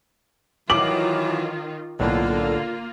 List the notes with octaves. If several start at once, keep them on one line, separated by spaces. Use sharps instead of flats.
D#3 E3 F#3 F4 D6 F#7
B1 A2 D3 A#3 F4